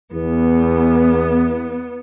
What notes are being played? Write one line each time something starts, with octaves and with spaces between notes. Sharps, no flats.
E2 B3